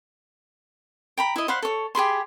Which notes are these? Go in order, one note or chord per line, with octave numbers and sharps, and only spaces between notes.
G5 A#5 B5
E4 D#5
C5 F5 F#5 B5
A4 C#5
G4 G#4 B5 C6